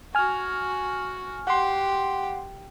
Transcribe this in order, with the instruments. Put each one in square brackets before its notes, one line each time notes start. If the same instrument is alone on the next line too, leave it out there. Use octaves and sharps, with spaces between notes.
[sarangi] F#4 [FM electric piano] G#5 F6
[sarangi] G4 [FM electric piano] F#5 C6